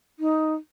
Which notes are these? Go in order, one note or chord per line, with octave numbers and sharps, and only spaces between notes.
D#4